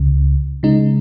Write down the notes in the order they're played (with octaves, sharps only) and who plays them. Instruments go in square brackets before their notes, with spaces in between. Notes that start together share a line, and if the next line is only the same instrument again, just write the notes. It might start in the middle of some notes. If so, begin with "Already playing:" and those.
Already playing: [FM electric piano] C#2 C#3
C#3 G#3 D#4